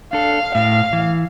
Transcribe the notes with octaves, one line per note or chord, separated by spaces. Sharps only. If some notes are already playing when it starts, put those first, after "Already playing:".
D4 A4 F5
A2 F5
E3